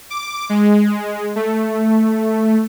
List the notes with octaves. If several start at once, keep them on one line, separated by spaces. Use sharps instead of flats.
D6
G#3
A3